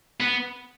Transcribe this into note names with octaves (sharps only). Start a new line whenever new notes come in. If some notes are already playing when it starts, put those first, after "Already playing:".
B3